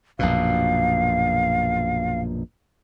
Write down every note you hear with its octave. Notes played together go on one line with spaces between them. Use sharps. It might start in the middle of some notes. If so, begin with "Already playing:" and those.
A#1 F#2 B2 F5